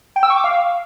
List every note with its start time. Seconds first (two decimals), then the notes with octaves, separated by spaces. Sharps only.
0.16 G5
0.23 E6
0.30 C#6
0.37 D6
0.44 F5